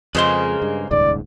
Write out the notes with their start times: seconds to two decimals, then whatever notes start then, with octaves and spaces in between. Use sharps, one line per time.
0.15 F2 C#3 G#3 A#3 B4 C5 C6
0.62 G2
0.91 D#1 C#2 G#2 D5